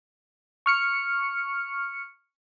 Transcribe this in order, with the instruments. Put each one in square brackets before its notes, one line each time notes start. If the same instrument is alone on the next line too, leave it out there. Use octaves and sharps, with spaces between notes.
[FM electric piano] C#6 F6 C#7